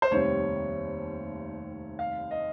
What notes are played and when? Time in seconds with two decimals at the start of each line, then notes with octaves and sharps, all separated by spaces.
0.02 C5
0.11 F1 D#2 D#3 G3 C4 C#5
1.99 F5
2.31 D#5